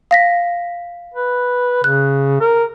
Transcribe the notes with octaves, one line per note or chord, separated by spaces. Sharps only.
F5 A#6 B6
B4
C#3 F#6
A#4